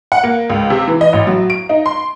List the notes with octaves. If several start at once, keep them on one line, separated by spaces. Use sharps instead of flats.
F#5
A#3
C#2
C3
E3
D#5
A1
F#3
D7
D#4
C6